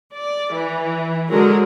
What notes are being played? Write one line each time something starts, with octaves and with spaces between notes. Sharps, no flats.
D5
E3
D3 F#3 G#3 G#4 A#4